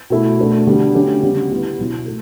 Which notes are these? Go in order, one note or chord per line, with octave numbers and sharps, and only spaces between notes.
B2 A3 E4
B2 A3 D4 F#4
D3 G3 B3 D4 F#4
D3 F#3 A3 C#4 G4
C#3 G3 B3 F#4
G3 B3 E4 B4
B2 F#3 B3 E4
A3